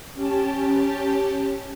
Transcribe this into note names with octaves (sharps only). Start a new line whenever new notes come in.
C#4 G4 A5